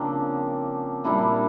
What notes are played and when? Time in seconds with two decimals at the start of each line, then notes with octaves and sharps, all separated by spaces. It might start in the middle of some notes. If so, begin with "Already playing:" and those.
Already playing: C#3 F3 A#3 C4 D4
1.04 A#2 G3 A#3 D4 E4